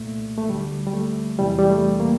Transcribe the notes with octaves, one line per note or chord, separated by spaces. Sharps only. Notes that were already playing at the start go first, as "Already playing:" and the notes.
Already playing: C2 A#2 A3
A3
D2 D3 G3
G3
A3
E2 C3 E3 G3
G3
A3
A#3